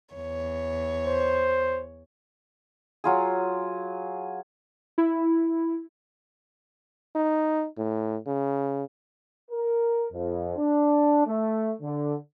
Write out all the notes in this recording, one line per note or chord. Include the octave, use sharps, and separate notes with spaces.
E2 C#5
C5
F#3 F4 G#4
E4
D#4
A2
C#3
A#4
F2
D4
A3
D3